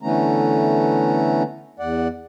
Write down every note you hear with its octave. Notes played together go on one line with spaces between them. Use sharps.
D3 E3 A3 B3 C#4 A#5
E2 D5 F#5